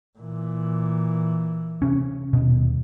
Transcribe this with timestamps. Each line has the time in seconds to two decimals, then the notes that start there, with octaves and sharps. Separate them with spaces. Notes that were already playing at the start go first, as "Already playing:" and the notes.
0.19 A#2 E3
1.82 C3 C#4
2.33 D#1 B2